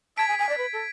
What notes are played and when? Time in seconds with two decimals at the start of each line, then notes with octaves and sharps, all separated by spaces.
0.17 A5 G#6 B6 D7
0.28 G#5
0.39 G#5
0.49 D5
0.58 B4
0.73 A4